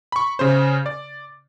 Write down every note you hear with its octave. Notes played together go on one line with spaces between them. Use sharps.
B5 C#6
C#3 C#4 C5
D5